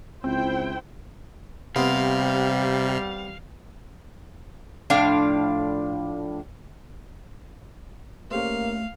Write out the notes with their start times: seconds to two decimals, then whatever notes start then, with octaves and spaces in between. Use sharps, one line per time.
0.24 C#2 C4 E4 C5 G5
1.76 C3 G3 B3 C4 F5
4.90 A2 F3 D4 F5
8.31 A3 A#3 C#4 G4 C5 F5